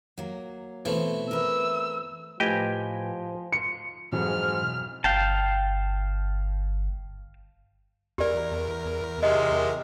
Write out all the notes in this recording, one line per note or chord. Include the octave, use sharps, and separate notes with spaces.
F#3 A#3
B2 E3 A3 C4
A#4 B4 E5 E6
A2 F3 G4 B4 D#5 G5 G#5
C6 C#7
B1 F2 G#2 B2 E3 F#3 F#4 F6
G1 F5 G5 A5
E2 G4 A#4 D5
C3 D#3 F#3 G#3 D#5